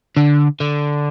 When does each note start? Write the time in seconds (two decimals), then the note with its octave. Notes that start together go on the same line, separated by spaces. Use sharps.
0.17 D3
0.60 D3